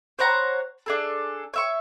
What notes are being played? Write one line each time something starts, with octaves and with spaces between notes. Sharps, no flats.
C5 C#5 F#5 A#5
D4 G#4 A4
C#5 E5 C#6